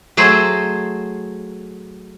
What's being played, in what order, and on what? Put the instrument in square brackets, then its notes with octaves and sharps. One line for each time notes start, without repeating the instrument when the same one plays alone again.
[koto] F#3 A3 G#4 C5